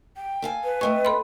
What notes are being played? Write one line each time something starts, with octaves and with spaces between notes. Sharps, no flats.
G5
A4 F5 G#5
B4
A3 C4 D#4 C#6
A4 B5 C6